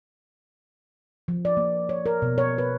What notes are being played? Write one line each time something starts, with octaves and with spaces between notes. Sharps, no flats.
F3
D5
A#3
C#5
A#4
B2
C#5
B4